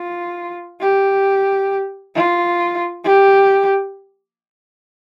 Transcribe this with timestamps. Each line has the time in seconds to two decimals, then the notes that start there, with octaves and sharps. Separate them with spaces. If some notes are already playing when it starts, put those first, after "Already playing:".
Already playing: F4
0.80 G4
2.15 F4
3.04 G4